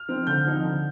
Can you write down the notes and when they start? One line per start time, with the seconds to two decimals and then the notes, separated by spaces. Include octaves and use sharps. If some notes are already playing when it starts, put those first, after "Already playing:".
Already playing: F6
0.08 F3 C4 D#4
0.27 D3 G6
0.45 F3 C4 D#4
0.64 D3